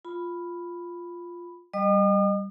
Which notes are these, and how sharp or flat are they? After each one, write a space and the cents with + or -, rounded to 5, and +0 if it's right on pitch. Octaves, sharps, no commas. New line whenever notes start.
F4 +0 B5 +0
G3 +0 D#5 -30 D#6 -45